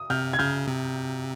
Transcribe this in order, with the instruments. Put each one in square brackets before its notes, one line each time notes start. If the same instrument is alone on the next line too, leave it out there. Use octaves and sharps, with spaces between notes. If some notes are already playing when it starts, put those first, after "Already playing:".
Already playing: [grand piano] D#6
[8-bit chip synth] C3 [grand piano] F6 G6
[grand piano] G#6
[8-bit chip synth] C#3 [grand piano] F6 G6
[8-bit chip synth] C3